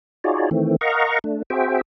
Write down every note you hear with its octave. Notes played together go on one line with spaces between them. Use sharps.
D#4 F4 F#4 G#4 C#5 D5
D#3 E3 A3 C4
A#4 D#5 F5 F#5 A#5 C#6
A3 D4
C4 F#4 G#4 C5 E5 G5